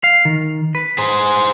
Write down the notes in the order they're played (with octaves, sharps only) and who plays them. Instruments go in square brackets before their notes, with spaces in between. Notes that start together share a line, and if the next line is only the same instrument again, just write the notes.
[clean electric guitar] F5
D#3
B4
[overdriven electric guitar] G#4 C5